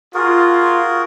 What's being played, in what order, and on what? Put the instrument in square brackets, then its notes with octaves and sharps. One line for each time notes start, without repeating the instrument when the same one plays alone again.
[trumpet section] F4 [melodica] F#4 G#4 A#4